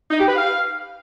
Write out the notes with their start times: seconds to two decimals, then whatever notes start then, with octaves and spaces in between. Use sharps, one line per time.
0.10 D#4
0.18 G4
0.27 B4
0.36 F5